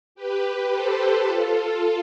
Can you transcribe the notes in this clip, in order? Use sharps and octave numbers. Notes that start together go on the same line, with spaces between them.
G4 B4
A4 C5
F4 A4